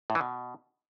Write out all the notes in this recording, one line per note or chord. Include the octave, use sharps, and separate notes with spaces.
A2
E3
B2